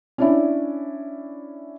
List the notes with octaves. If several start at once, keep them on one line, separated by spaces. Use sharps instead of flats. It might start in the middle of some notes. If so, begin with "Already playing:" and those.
C#4 D4 E4